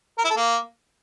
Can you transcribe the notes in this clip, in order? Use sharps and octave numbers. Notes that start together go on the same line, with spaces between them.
A#4
E4
A4
A#3